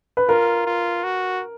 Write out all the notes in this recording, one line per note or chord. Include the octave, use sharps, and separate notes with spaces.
B4
F4 A#4
F4
F#4